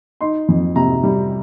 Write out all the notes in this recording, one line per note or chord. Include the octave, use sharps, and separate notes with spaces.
D#4 C6
F2
C3 A#5
G3